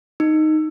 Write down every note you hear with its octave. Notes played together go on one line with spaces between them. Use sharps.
D#4